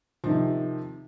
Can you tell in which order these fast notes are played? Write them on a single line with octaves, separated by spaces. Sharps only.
F3 D#3 C3